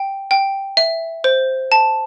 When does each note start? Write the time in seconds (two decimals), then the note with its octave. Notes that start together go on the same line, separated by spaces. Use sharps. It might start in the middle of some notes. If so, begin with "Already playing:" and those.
Already playing: G5
0.31 G5
0.77 E5
1.24 C5
1.72 A5